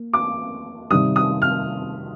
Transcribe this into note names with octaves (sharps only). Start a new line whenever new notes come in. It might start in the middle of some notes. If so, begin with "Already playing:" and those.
Already playing: A#3
D6
C3 D#3 G3 D#6
D#6
F6